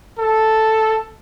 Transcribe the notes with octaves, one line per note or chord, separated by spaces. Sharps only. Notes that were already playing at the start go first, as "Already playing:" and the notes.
A4